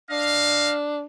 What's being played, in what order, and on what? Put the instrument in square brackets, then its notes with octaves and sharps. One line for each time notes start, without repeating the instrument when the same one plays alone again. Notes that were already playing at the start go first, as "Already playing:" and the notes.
[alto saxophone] D4 [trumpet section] D#5 F5